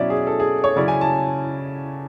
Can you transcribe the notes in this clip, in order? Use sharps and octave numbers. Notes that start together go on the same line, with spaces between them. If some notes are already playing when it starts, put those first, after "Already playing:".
Already playing: B2 F#3 C#4 E4 D5 E5
G#4
A4
G#4
C#5
C#3 F#3 C#4 E4 D5
G#5
A5